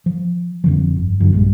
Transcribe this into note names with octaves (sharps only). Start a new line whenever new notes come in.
F3
F2 D3 F3
G1
F#2 D3
A#1 G2 D3 G#3